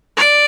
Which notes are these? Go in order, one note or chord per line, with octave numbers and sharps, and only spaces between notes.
D5